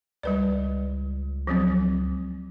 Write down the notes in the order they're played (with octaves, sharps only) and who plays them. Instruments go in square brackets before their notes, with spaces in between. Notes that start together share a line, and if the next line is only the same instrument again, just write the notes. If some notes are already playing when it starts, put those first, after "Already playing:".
[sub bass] C#2 [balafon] G3 B4 D5
[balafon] F3 F#3 C4